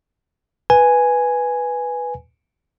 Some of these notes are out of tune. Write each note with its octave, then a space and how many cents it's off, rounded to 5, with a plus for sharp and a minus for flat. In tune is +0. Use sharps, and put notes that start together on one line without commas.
B4 +0 G#5 +0